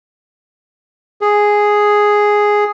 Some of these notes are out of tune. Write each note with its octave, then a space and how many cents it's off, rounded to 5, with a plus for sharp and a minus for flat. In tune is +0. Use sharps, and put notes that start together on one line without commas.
G#4 +0